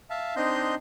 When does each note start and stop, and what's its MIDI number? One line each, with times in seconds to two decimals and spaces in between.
0.10 0.35 76
0.10 0.35 77
0.10 0.35 81
0.36 0.75 60
0.36 0.75 62
0.36 0.75 63
0.36 0.75 75
0.36 0.75 84
0.36 0.75 91